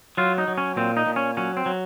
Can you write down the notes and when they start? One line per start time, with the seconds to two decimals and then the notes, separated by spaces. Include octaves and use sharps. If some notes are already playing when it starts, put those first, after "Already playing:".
0.17 F#3 F4
0.38 D#4
0.48 F#3
0.58 C#4
0.77 A#2 C4
0.97 D#4
1.07 A#2
1.16 C#4
1.37 F#3 C#4
1.57 C4
1.66 F#3